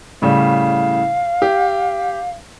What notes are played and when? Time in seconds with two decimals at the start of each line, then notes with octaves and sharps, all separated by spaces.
0.22 A2 C#3 G3 F5
1.42 G4